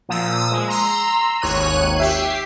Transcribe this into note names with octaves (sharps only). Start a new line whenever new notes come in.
A#2 F3 D#6 E6
G#3
A#5 C6 E6
G#1 D#2 C#5 F#6 D#7
G4 E5 C7